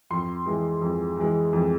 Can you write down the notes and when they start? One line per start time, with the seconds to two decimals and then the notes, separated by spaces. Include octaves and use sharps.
0.10 F2 C6
0.46 E3 G#3
0.82 F2
1.17 E3 G#3
1.53 F2